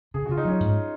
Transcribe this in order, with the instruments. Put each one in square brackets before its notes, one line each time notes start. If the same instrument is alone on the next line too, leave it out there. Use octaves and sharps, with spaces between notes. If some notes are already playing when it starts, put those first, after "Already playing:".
[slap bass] C#3 [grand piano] G#4
[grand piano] F#4
[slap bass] C#3 [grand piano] F4
[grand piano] D#4
[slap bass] F#3 [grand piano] C#4
[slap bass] G#2